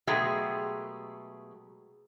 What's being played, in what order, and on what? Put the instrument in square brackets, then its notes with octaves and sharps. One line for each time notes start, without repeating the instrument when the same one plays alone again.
[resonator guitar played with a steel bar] B2 F#3 G#3 A3 G4 G#4